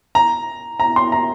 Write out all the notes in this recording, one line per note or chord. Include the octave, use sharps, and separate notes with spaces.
A#5
A#5
C6
A#5